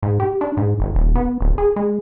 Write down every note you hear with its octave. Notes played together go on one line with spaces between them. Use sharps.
G#2
G4
D4
G#2
G1
D#1
B3
D1
G#4
G#3